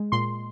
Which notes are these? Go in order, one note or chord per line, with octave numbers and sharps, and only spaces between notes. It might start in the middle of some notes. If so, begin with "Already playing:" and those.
Already playing: G#3
A#2 C6